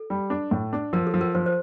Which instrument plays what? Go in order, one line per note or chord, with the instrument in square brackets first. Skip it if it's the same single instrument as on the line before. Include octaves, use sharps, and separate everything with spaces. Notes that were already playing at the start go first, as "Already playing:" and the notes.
Already playing: [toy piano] A4
[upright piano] G3
D4
A2
D4
[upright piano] F3 [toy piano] A#4
[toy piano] A4
[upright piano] F3
[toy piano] A#4
[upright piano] F3 [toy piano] C5
[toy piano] C5